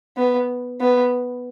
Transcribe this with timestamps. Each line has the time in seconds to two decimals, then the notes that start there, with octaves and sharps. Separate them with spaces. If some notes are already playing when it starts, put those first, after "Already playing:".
0.17 B3
0.81 B3